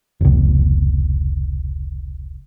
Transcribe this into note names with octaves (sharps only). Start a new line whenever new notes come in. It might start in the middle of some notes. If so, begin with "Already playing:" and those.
F1 C#2